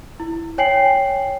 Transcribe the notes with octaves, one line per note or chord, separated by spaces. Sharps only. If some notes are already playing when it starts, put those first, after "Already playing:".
E4
C#5 G5 G#5 C7 F#7